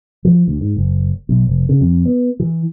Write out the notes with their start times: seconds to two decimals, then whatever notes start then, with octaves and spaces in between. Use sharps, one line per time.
0.25 F3
0.48 D2
0.61 G#2
0.76 F#1
1.29 B1
1.47 F1
1.69 C#3
1.81 F2
2.05 B3
2.40 E3